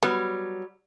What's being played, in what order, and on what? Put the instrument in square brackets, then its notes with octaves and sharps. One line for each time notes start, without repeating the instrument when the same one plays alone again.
[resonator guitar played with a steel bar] F#3 G3 [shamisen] B3